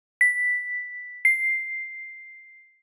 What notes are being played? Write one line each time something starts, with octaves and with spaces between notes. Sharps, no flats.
B6
C7